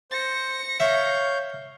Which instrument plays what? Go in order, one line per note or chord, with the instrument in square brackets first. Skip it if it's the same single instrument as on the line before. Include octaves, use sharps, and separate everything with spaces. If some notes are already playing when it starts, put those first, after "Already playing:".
[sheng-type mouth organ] C5 [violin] A#6 C#7
[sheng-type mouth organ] C#5 F5 G6 [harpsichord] E5